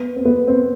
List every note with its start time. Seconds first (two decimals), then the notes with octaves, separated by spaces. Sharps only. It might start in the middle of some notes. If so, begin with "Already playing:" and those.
Already playing: B3
0.16 C4
0.25 B3
0.47 C4